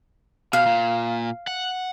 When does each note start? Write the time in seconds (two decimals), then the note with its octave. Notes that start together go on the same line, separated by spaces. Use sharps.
0.53 B2 F5
0.66 A#2
1.47 F#5